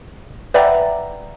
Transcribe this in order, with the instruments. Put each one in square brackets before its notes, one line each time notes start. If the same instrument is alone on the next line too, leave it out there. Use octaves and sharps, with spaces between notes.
[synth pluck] B4 D5 E5 F#5 G5 A#5